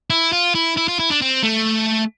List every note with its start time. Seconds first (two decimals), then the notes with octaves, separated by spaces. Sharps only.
0.10 E4
0.32 F4
0.55 E4
0.77 E4
0.88 F4
0.99 E4
1.10 D4
1.22 C4
1.43 A3